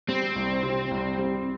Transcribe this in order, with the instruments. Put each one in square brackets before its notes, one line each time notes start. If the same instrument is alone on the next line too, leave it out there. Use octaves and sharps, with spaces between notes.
[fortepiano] G3 [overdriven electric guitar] C4
[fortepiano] C2
C3
C2
G3